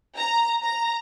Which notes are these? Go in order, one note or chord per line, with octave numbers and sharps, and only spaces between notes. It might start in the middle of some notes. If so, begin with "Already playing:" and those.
A#5
A#5